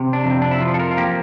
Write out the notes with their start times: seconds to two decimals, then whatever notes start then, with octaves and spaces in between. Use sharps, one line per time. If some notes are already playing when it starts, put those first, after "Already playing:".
Already playing: C3
0.13 D4
0.25 F2
0.31 C4
0.42 D4
0.51 E4
0.61 F3 F4
0.74 A4
0.79 A#4
0.91 F4
0.97 A#3 G4